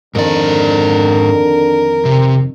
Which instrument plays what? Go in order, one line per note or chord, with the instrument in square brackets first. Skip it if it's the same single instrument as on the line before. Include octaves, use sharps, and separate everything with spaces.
[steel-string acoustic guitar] F2 D#3 [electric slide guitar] G#2 D5 [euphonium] D3 [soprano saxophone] A#4
[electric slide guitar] C3